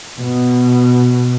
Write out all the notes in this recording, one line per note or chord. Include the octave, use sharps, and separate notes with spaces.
B2